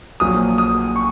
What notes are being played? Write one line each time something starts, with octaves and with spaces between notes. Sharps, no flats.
A#1 A#2 F#3 D#6
D#6
C#6